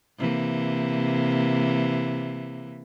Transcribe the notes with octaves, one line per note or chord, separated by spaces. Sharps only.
C3 E3 A#3